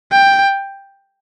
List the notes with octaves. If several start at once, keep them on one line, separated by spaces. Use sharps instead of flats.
G5